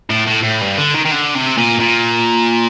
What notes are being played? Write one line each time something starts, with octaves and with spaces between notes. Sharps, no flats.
A2
A2
A2
G2
D3
D#3
D#3
D3
C3
A#2
A#2